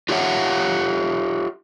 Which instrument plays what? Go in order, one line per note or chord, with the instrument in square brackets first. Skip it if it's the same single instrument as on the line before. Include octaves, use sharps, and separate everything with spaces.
[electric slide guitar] F4 G4 C#5 E5 F#5